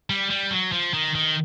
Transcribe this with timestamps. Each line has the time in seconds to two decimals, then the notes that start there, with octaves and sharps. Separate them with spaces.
0.10 G3
0.30 G3
0.51 F#3
0.72 F3
0.94 D#3
1.15 D#3